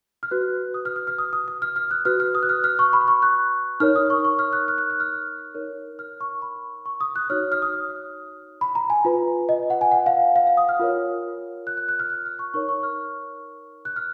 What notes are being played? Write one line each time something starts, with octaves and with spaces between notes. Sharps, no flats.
F6
F#4 B4 F#6
D#6
F6
F6
F6
D#6
D#6
D#6
F6
F6
F#6
F#4 B4 F6
F6
D#6
F#6
F6
F6
C#6
B5
C#6
F#6
D#4 A#4 C#5 F6
D#6
C#6
C#6
F6
F#6
F6
F#6
F#6
F6
D#4 A#4 C#5
F6
C#6
B5
C#6
D#6
F#6
D#4 F#4 C#5 F6
F6
D#6
B5
A#5
G#5
F4 B4
D#5
F#5
G#5
F#5
F5
F5
F5
D#6
F6
F4 A#4 C#5
F#6
F#6
F#6
F6
F#6
F6
C#6
D#4 A#4 C#5 C#6
C#6
F6
F#6
F6